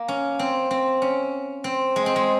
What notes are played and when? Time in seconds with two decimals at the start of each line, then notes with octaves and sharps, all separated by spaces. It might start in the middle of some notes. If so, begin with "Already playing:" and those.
Already playing: A#3
0.08 C#4
0.39 C4
0.71 C4
1.02 C#4
1.64 C4
1.96 G#3
2.06 C4
2.16 G#3